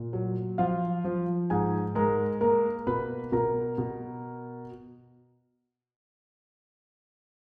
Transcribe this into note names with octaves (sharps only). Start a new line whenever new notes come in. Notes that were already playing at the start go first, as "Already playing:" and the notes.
Already playing: A#2
F#3
F3 F4 F5
F3
G#2 G#4 G#5
G#3 A#4 A#5
A#3 A#4 A#5
B2 B4 B5
B2 A#4 A#5
B2